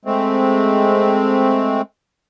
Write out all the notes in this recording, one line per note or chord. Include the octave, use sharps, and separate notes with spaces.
G#3 A3 C4